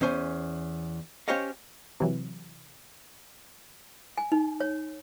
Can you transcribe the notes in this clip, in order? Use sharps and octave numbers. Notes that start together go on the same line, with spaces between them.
E2 C#4 C5 G#5
C#4 G4 C5 C#5 D#5 F5
C3 E3 F#3
G#5
D#4
C#5